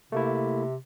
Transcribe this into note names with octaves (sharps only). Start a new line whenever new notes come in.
C3 A3 A#3 E4